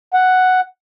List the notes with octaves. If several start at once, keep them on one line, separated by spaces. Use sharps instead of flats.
F#5